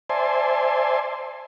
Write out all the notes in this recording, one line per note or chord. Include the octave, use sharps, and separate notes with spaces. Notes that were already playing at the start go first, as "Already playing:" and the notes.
C5 D5 E5 G#5 A5 C6